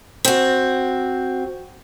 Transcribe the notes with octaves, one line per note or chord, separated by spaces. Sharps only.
C4 F#4